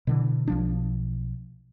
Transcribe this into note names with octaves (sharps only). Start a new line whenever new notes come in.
B2 D3 E3
B1 F3 D4